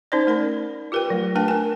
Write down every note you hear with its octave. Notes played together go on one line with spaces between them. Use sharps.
C#4 D#4 C5 D5
A3 A#4 B5
F4 G4 A#4 B4 G5
F#3 A3
A3 D4 A#4 B4 G5 A5
A#4 G#5